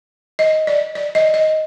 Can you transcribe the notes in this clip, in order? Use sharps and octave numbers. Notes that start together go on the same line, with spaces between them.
D#5
D5
D5
D#5
D#5